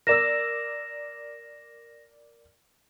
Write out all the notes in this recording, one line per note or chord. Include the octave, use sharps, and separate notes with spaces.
A#4 D5 E6 A#6 E7